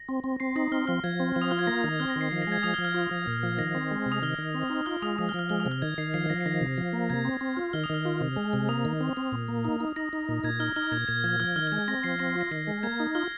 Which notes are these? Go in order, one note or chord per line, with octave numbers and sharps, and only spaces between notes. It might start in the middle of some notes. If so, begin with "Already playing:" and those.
Already playing: A#6
C4
C4
C4 C7
D#4 A#6
C4 F6
F3 F6
F3 G#6
C4
F3
D#6
F4 F6
G#6
A#3 A#6
D#3
C4 F6
A#6
D#3
C7
F3 C7
A#6
G#3 G#6
F3 D#6
F6
F3
F6
F4
F3
A#2
F3
D#3 A#6
C4
G#3
C3
D#6
D#3 F6
D#3
C4
D#4
F4 F6
G#3 D#6
F3 D#6
F6
F3
F6
G#3 F6
D#6
C3
F6
D#3 G#6
D#3 C7
F3 C7
F3 A#6
C7
D#3 A#6
C3
F3
A#3
C3 G#6
C4
C4
F4
D#3 F6
D#6
D#3 F6
F4
C3
G#3
C3
A#3 D#6
D#3
C4
C4
A#2
A#3
D#4
D#4
D#4 A#6
D#4
A#2
A#2 G#6
D#4 F6
D#4 F6
A#2 G#6
A#2 G#6
F3 G#6
F3 F6
D#3 F6
F6
G#3 G#6
C4 A#6
F3 C7
C4 A#6
C7
F4
A#6
D#3 A#6
G#3
A#3 G#6
D#4
F4 F6